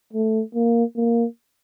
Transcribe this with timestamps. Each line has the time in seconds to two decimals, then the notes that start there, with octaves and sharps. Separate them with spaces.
0.13 A3
0.55 A#3
0.96 A#3